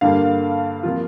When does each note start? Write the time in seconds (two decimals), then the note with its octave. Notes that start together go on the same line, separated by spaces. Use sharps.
0.01 G2 D3 G3 A#3 F5
0.83 C3 F3 A#3 F4